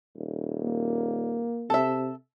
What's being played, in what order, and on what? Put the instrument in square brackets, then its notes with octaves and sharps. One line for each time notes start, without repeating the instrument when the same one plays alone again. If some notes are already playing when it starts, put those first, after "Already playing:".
[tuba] D#1
[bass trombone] A#3
[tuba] C3 [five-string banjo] A4 E5